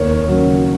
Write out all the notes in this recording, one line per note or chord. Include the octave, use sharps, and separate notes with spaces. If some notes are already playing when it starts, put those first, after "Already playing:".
Already playing: D#2 A#4 C#5
C#3 F#3